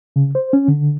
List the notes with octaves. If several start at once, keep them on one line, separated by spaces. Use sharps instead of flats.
C#3
C5
C#4
D3